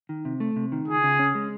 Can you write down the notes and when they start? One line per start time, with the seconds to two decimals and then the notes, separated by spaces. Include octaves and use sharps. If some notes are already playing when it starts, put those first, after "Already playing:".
0.09 D#3
0.25 C3
0.40 A3
0.56 C3
0.72 D#3
0.88 C#2 G#4
1.03 C#3
1.19 C#4
1.35 G#3